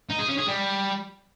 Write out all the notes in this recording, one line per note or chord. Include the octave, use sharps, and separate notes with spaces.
D#4
G#4
C#4
G#4
G3